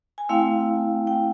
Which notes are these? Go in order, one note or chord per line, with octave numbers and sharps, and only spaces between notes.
G#5
A3 C4 E4 F5 G5
G5